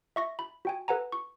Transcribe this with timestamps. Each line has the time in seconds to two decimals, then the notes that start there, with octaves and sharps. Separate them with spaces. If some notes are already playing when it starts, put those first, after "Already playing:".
0.16 E5 C#6 A#6
0.39 B5
0.65 F#4 G5 G#5
0.88 A4 B4 F#5 G#5 A#5
1.12 C#6